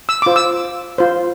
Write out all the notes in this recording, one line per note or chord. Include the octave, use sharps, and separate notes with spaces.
E6
F4 C5 D6
E6
F4 C5